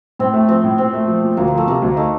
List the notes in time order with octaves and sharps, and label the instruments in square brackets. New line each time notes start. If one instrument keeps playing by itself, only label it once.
[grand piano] A2 [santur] C4
[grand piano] A3
[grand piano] F3 [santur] C4
[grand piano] A2
[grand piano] A#2 [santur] C4
[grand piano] A3
F3
A#2
[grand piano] D2 [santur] A#3
[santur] A#3
[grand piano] F3 [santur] A3
[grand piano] C3 [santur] A#3
[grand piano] D2
[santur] A3 [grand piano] D#4